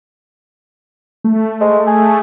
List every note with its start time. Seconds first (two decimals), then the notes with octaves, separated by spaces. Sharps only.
1.24 A3
1.61 G#3
1.87 G#4